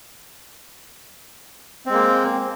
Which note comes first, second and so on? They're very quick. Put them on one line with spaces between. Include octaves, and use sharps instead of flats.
C4 G#3 A#3